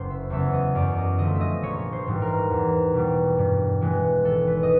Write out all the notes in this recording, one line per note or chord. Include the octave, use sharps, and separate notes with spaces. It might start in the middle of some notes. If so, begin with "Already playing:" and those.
Already playing: F#1 C5
E5
E2 C#3 F#3 B3 E5
D#5
F#2 D5
D#5
D3 F3 A3 D#5
E5
D#5
A#1 C#5
C5
G#2 E3 G3
A#4
E2
B2 G3
G2
E3 G#3 B3
G#1 A4
B4
D#5